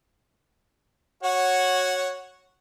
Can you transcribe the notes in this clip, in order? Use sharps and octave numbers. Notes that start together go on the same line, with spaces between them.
F#4 C#5 F#5